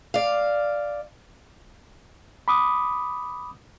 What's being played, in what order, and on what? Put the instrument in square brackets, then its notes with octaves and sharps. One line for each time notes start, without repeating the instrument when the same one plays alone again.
[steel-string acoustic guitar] D5 F5
[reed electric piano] B5 D6 D#6